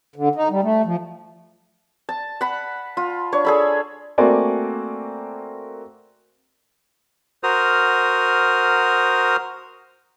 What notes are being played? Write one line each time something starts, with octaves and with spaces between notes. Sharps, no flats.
D3
D#4
G3
A3
F3
A5
F#5 B5
F4
D4 C#5
G#4 A4 B5
A3 A#3 C4 F#4 D5 G#5
F#4 A#4 C5 D#6 F6